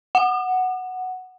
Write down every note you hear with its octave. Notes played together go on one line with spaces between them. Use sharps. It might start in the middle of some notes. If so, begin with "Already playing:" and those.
F#5